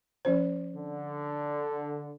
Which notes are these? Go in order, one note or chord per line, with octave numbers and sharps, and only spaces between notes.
F3 C#4 C5
D3